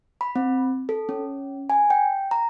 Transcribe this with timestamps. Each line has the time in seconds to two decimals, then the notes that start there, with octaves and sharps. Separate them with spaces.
0.21 B5
0.36 C4
0.89 A4
1.09 C#4
1.70 G#5
1.90 G5
2.31 A#5